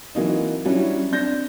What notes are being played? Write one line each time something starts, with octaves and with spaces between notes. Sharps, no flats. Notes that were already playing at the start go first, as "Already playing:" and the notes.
E3 F#3 A#3 C4 D#4
F#3 G3 C#4 D4 E4
C4 D4 G6 A#6